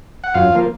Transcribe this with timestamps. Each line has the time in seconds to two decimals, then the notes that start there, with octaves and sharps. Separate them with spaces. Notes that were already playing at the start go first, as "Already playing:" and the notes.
0.24 F#5
0.34 F#2 F4 F5
0.52 F3 A#3